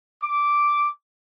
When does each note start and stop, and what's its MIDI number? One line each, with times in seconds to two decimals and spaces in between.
0.22 0.89 86